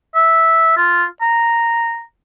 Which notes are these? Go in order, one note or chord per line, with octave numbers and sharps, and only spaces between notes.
E5
F4
A#5